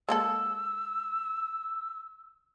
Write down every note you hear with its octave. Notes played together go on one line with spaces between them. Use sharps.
G#3 A#3 A4 E6